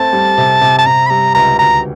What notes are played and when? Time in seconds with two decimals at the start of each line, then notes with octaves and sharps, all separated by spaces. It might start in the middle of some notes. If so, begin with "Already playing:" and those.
Already playing: A3 C4 A5
0.13 G3
0.38 C3
0.61 C3
0.78 A5
0.86 C3 A#5
1.06 B5
1.10 G3 A#5
1.35 C#2 A#5
1.59 D2 A#5